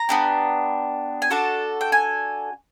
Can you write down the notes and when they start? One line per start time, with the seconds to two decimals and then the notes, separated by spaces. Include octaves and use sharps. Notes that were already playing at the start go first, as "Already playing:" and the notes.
Already playing: A#5
0.09 B3 D4 G4
1.22 G#5
1.30 D4 F#4 A4 A5
1.81 G5
1.92 G#5